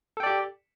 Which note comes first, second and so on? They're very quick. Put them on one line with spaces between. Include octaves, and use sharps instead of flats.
A4 G5 D5 G4